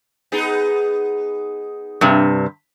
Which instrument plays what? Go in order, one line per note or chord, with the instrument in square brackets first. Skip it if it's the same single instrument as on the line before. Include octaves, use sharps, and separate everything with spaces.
[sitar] B3 D#4 G#4
[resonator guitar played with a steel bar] G2 C3